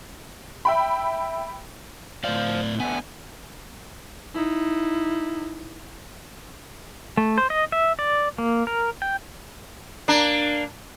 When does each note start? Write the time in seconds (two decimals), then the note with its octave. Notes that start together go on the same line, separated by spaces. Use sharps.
0.65 E5 G5 B5
2.24 A2 C5 D5 F5
2.80 D3 A3 B3 G#5
4.34 D#4 E4
7.17 A3
7.38 C5
7.50 D#5
7.72 E5
7.99 D5
8.38 A#3
8.67 A#4
9.02 G5
10.08 A#3 D4